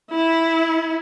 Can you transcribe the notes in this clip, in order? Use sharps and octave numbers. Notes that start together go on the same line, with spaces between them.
E4